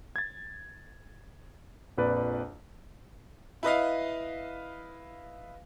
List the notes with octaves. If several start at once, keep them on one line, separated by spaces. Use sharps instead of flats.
G#6 A6
A#1 F2 B4 D5
E4 B4 D#5 F5